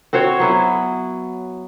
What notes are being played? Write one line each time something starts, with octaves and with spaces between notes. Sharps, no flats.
C4 F#4 C5 C#5
F#3 B3 E4